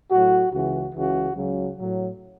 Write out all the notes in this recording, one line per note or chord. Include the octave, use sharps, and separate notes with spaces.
A2 F#3 F#4
C#2 C#3 E3 F#4
C#2 C#3 E3 F#4
C#2 C#3 F#3
A2 F#3